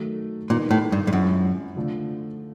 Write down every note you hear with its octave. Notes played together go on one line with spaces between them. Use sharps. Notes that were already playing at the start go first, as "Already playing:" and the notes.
Already playing: D#3 F#3 A3
A#2 D#3 G3 B3 D#4
A2
G2
G2
F#2 F3 G#3 C4 E4
D3 F3 A3 D4